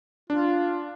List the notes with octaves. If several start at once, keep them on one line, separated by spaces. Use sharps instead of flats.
D4 F4